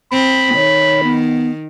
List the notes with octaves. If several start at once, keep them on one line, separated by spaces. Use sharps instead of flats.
C4 B5
D#3 C#5
B3